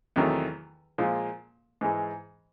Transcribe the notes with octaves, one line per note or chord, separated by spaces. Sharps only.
E2 C3 D#3 F#3 A3
A#2 F3 G#3
G#2 E3 G#3